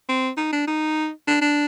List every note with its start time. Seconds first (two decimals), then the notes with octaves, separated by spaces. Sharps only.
0.09 C4
0.37 D#4
0.53 D4
0.68 D#4
1.28 D4
1.42 D4